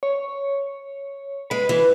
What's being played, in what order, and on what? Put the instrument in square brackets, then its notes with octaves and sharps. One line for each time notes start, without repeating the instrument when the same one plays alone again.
[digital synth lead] C#5
[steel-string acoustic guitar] G#3 [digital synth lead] B4
[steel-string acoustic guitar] E3